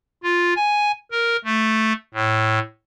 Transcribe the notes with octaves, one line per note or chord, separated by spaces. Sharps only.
F4
G#5
A#4
A3
A2